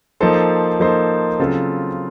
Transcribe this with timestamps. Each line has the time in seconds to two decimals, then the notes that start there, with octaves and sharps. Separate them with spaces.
0.20 F3 A#3 D#4 A4 C5
0.80 F3 A#3 D#4 A4 C5
1.39 C#3 F#3 C4 F4 A4